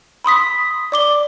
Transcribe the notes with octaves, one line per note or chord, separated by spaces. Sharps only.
B5 C6 D#6 B6
D5 D6 G7